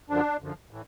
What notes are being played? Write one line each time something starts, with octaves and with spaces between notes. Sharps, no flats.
F#2 D3 F3 D4
F#2 D3 F3
A2 E3